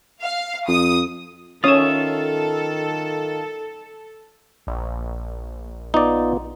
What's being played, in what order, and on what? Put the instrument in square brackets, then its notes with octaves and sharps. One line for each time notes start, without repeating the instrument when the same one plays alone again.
[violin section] F5
[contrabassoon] F2 [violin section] D#6
[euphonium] D#3 [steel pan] C#4 C#5 D#6 [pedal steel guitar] F4 E5 [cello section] A4
[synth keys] A#1
[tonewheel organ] B3 F4 [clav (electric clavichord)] D#4 D5